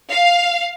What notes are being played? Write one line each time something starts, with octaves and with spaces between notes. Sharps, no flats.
F5